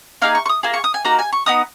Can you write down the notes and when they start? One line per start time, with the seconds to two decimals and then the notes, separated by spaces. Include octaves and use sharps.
0.22 A#3 D#4 G#4 F5
0.35 C#6
0.46 C#6
0.49 D#6
0.63 A#3 F4 G#4
0.74 C#6
0.84 D#6
0.94 G#5
1.05 A#3 D#4 F#4 A#5
1.19 G#5
1.33 C#6
1.46 B3 D#4 D#6